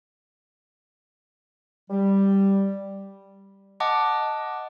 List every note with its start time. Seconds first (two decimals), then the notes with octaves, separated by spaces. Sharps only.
1.90 G3
3.80 D#5 F#5 A5 D6